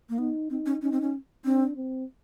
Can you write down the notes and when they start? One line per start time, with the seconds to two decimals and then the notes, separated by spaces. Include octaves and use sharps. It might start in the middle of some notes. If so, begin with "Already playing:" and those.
0.09 A#3
0.18 B3 D#4
0.50 C4 D#4
0.66 C#4
0.82 C#4 D#4
0.92 C4
1.01 C#4
1.45 C4 D4
1.76 C4